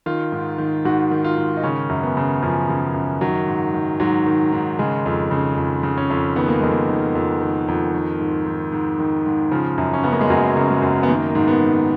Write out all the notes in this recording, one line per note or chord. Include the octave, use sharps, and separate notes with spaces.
D#3 F4
G#2
D#3
G#2 F#4
D#3
F4
G#2
D#4
C#3 C#4
F#2
B3
C#3
F#2 F3
C#3
F#2
D#3 F#3
G#2
D#3
G#2 F#3
D#3
G#2
C#3 G#3
F2
C#3
F2
C#3
C#4
F2
D#3 B3
A#3
F2 G#3
A#3
D#3
F2
D#3
F2
D#3
G#2
D#3
G#2
D#3
G#2
C#3 F3
F#2
C#4
C#3 B3
A#3
G#3
F#2 F#3
C#3
G#3
F#2
B3
D#3 A#3
G#2
B3
D#3